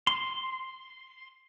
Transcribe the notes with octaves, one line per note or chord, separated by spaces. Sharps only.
C6